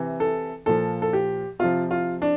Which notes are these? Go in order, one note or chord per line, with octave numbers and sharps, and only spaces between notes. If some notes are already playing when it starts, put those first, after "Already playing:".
Already playing: C3 E3
A4
A#2 F3 A4
A4
G4
C3 F3 F4
F4
D4